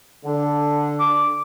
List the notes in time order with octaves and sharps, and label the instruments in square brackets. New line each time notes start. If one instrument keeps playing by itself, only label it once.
[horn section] D3
[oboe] D6